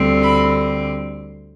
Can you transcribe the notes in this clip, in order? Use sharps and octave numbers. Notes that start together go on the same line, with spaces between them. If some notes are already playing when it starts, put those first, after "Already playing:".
Already playing: D2 D3 G3 C4
B5